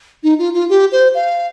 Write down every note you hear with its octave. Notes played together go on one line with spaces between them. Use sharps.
D#4
F4
F4
G4
C5
F5